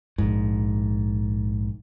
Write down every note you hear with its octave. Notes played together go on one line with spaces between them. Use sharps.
A#1 G#2